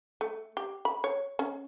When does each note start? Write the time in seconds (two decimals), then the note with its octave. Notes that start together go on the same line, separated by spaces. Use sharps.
0.21 A3
0.57 G4
0.85 B5
1.04 C#5
1.39 C#4